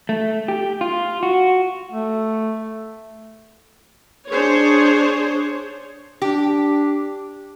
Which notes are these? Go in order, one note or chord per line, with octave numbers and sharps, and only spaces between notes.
A3
G4
F4
F#4
A3
D4 G#4 C5 C#5
D4 G4